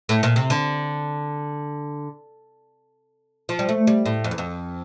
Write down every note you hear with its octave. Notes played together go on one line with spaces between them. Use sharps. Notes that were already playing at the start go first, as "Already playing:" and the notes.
A2
A#2
C3
D3
F3
G3
A3
G3
A2
F2
E2
F2